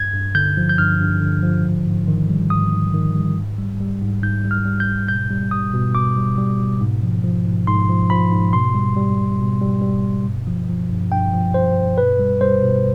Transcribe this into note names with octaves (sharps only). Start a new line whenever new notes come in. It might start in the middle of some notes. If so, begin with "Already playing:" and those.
Already playing: G2 G#6
G2
D3 G6
F3
G6
G2 F6
G2
D3
F3
G#2
G#2
D#3
G3
G#2 D#6
G#2
D#3
G3
G#2
G3
G3
G#2
G#2 G6
G3
F6
G3
G6
G#2
B2 G6
G3
G3 D#6
B2
B2 D6
G3
G3
B2
G#2
F3
F3
G#2
G#2 C6
F3
F3 B5
G#2
B2 C6
G3
G3
B2
B2
G3
G3
B2
G2
F3
F3
G2
G2 G5
F3
F3 C5
G2
B2 B4
G3
G3 C5
B2